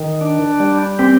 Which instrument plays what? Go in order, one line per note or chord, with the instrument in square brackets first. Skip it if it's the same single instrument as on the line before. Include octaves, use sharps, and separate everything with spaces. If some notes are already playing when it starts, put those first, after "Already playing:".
Already playing: [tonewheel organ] D#3
D4
G3
[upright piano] C4 [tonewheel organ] G4